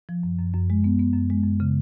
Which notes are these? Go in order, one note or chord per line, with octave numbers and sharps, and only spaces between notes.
F3
F#2
F#2
F#2
G#3
B3
B3
F#2
G#3
F#2
C#3